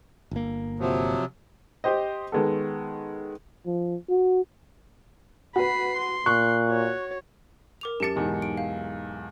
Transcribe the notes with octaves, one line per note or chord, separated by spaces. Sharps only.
G1 A#3
C3 F3 F#3
G4 C5 D#5
D#3 G#3 B3 A4
F3
F#4
F#4 B4 B5 C7
C6
A#2 C#6 F#6
F#4 C#5
A#4 D6 F7
F#2 G4 A5 A6 C#7
B1 E2 G#2
D7
F5